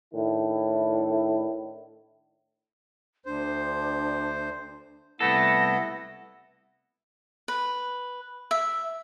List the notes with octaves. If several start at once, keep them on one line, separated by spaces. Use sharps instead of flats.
A2 D#3 D4 E4
D2 D4 C5
C2 A3 B3 E4 A4 F#5 A#6
B4
E5